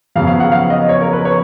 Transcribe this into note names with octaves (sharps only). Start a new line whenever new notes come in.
F2 C#3 F#3 B3 F5
F5
F#5
F5
D#5
C#5
A#4
B4
C#5